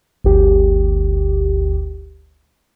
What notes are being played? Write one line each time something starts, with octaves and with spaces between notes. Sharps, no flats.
G1 D2 G4